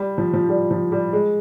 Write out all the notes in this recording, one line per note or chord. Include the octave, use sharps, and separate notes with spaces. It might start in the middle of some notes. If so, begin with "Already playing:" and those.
Already playing: G3
F3
F3
G3
F3
G3
G#3